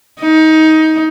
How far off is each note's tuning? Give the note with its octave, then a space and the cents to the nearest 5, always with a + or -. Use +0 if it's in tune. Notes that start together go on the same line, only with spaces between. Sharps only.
D#4 +20